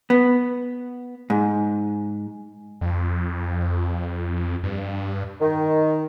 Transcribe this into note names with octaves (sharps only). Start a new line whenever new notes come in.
B3
G#2
F2
G2
D#3